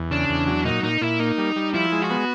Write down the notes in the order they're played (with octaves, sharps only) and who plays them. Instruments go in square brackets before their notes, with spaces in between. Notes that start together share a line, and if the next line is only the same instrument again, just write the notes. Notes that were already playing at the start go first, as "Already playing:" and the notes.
Already playing: [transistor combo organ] E2
[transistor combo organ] C#3 [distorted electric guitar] D4
[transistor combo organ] E2
F#3
[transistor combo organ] A#2 [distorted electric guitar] D#4
[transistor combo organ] A#2 [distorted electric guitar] D#4
[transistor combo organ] A#2 [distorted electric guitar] E4
[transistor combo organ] A#3 [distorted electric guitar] D#4
[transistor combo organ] G3
G3
[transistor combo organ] F3 [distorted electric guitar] E4
[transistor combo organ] G#3
[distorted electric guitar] F#4
[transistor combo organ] B3